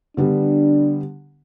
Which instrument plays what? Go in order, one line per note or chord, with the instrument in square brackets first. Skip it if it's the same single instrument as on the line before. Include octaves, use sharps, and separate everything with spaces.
[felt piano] D3 G3 B3 [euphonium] D4